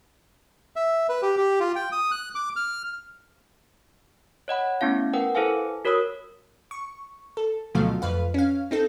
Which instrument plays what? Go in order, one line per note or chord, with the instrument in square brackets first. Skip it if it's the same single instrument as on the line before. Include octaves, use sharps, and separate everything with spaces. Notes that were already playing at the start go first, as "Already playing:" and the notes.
[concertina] E5
B4
G4
G4
F4
G5
D#6
F#6
D6
F6
[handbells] C#5 D#5 F#5 B5
A3 B3 C#4 E4 F5
A#4 B4 F#5 G5
E4 A4 B4 C5 F5 G#5
F#4 A#4 C#5 B5 D#6 E6
[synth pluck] C#6
A4
D2 B2 F3 F#3 A3 F5
F2 B4 F5
C#4 F5
C4 D#4 A4